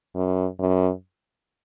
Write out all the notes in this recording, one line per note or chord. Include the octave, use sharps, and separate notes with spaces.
F#2
F#2